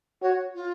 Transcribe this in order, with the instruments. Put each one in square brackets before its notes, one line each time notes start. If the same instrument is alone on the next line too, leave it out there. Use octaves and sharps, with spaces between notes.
[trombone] F#4 [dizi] C#5
[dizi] F4